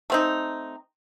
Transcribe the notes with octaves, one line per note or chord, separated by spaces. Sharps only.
A3 C4 D#4